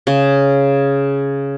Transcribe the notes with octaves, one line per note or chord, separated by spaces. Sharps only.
C#3